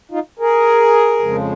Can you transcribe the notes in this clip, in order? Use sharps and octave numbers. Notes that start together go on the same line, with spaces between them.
D#4 F4
G#4 A#4
F2 C#3 F3 G#3